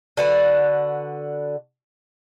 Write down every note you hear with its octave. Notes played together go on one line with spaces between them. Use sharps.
D3 F#4 B4